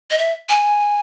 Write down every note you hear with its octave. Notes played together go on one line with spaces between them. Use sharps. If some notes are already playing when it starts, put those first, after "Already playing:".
D#5
E5
G#5